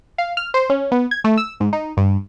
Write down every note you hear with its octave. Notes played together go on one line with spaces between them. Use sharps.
F5
F6
C5
C#4
B3
G#6
A3
E6
G#2
D#4
G2